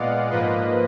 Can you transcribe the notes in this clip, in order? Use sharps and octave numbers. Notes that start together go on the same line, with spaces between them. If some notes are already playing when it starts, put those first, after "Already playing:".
Already playing: A#2 G#3 B3 D5 D#5 F5 F#5
G#2 F3 A#3 B4 D#5